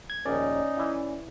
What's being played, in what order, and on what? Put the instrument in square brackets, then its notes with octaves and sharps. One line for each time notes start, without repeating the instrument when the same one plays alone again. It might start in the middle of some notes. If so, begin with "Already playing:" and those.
[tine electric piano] G#6
[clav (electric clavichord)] A#1 D#2 [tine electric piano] C#4 D5 [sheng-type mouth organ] D#4
[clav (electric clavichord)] E3 E4